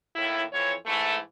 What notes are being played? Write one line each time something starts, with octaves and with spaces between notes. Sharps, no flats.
D#2 A2 E4
F2 E3 C#5
G#2 E3 A3